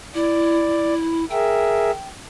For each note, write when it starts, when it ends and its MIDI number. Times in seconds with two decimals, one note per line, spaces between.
0.15 1.25 64
0.15 0.94 74
1.31 1.91 68
1.31 1.91 70
1.31 1.91 76
1.31 2.08 79